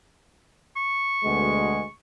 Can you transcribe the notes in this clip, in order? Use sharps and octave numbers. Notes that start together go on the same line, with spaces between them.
C#6
D2 B2 G#3